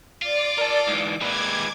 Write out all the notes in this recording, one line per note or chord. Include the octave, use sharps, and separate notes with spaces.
F4 D5 D6
A#4 A5
G#2 E3
D#2 A#2 G#3 B4 D6 G#6